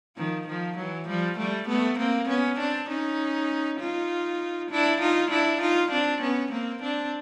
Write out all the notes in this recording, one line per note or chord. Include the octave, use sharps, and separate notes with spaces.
D#3 F3
D#3 F3
E3 F#3
F3 G3
G3 A3
A3 B3
A#3 C4
B3 C#4
C4 D4
C#4 D#4
D#4 F4
D4 E4
D#4 F4
D4 E4
D#4 F4
C4 D4
B3 C#4
A#3 C4
C4 D4